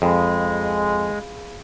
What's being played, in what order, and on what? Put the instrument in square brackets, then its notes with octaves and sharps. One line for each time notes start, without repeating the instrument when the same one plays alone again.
[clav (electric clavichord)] F2 [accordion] G#3 [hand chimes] G#4 F5 B5